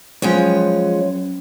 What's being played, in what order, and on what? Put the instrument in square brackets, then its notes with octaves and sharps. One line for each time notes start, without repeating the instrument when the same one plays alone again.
[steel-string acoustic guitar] F3 G#3 C#5 [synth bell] F#3 C#4